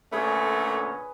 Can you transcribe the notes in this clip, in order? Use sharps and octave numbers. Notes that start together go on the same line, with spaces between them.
A#2 D3 A3 C#4 G#4 B4